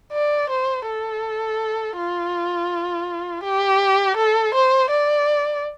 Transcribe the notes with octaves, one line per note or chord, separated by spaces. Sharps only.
D5
C5
A4
F4
G4
A4
C5
D5